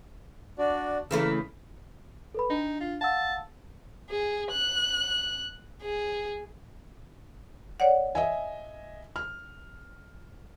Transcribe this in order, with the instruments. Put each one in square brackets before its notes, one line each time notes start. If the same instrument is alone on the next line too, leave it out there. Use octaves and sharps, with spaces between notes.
[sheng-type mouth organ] D4 F#4 D5
[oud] C#3 E3 A3 [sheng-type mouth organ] A#3 A#4 E6
[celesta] A4 B4 B5
[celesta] D4 [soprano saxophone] D#4
[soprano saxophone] F4
[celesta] F5 F#5 E6 [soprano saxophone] A5
[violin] G#4
F#6
G#4
[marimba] C#5 D5 F#5
[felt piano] D#5 E5 G#5
F6